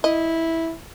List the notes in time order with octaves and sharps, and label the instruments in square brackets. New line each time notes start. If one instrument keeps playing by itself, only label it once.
[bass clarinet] E4 [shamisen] D#5